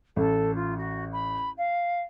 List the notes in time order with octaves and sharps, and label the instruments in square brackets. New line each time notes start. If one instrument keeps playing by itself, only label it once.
[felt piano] A1 [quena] A4
[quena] F4
F#4
B5
F5